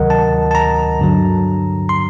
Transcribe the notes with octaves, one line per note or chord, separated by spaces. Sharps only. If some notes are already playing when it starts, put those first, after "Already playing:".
Already playing: D2 C3 D#3 F#3 A#4 D#5 F#5
A5
A5
A#5
G2 D3 F#3
C6